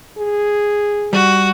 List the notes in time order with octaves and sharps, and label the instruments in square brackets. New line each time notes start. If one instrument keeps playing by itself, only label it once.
[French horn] G#4
[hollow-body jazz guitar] G3 [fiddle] F#4